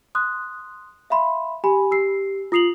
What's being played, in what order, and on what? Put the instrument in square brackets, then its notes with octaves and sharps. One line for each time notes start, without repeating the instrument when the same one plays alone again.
[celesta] C6 D#6 F#6
E5 F5 B5 C6
G4 G#5 B5
G4 E6 C7
F4 D#6 C7 F7 F#7